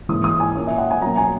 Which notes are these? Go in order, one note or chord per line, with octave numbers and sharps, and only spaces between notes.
G#2 E3 A#3 C#4 D#6
D#6
G#5
A#2 A#3 C#4
E5
F#5
G#5
B2 F#3 A#3 C#4 A#5
G#5